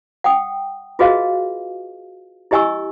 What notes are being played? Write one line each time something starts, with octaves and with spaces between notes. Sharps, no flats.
F#5 G5 D#6
F4 F#4 G#4 B4 D#5 F5
E4 G4 D#5 G#5 C#6 E6